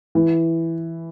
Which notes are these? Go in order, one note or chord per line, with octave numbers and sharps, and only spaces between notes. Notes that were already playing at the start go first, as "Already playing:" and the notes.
E3